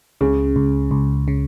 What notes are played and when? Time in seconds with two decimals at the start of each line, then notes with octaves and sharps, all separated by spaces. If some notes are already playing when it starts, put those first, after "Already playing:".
0.21 C#2 C#3
0.56 C#2
0.91 C#2
1.28 C#3